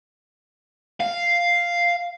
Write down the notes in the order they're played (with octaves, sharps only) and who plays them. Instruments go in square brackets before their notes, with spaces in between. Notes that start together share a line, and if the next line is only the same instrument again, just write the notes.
[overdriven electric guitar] F5